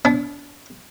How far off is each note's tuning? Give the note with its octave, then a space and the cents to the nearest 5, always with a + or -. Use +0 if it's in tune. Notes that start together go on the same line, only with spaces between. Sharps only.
D4 -30